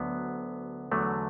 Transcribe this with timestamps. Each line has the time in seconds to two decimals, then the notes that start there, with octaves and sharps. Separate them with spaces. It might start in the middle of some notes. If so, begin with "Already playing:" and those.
Already playing: D2 D3 F#3 B3
0.91 E2 D3 F#3 A3